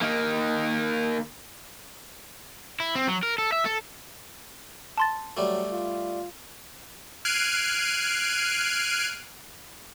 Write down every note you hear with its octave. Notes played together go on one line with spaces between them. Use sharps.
D#3 A#3
E4
C4
F#3
A#4
A4
E5
A4
A5 C6 A6
F#3 G3 A3
F4
F6 F#6 G#6 C7 D7 D#7